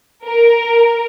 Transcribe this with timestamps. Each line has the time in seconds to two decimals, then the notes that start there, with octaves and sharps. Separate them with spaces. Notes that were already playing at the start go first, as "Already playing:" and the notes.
0.25 A#4